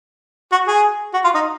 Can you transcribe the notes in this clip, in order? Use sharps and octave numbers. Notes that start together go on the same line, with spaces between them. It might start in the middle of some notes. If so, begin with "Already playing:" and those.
F#4
G#4
F#4
F4
D#4